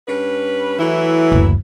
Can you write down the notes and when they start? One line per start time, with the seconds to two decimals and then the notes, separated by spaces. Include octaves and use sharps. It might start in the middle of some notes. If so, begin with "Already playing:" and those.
0.08 G2 C#4 B4
0.80 E3 F#3 A3 E4
1.32 F#1 D2